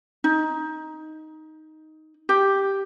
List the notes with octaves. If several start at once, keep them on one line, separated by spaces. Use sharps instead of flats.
D#4
G4